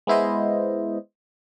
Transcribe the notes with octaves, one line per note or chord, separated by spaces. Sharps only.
G#3 B3 E4 C5 D#5